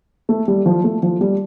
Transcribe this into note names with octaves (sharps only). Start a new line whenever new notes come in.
A3
G3
F3
A3
F3
G3